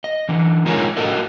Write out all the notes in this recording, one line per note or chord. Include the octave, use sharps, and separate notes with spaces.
D#5
D3 E3
G#3 D#4 F4 A#4 C#5 G#5
A2 F#4 A4 A#4 D#5